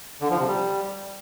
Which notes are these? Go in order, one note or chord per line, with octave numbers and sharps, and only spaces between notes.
D3
F3
C3
G3